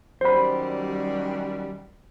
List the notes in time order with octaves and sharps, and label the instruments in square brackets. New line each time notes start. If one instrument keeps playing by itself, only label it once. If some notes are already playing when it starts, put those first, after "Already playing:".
[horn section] F#2 D#3 G3 [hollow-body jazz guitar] C5 B5